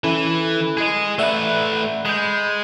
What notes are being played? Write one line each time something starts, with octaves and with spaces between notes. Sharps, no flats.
E3 C#4 E4 A4
G#4 D#5
A3 B4 D5 E5 F#5
G#3 B5 G6